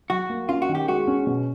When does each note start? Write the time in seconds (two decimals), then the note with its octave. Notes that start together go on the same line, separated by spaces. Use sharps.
0.10 F#3 F#4
0.30 A#3
0.49 C#4 F4
0.62 F#4
0.69 D#3
0.75 G4
0.88 G#3 F#4
1.07 C#4
1.26 B2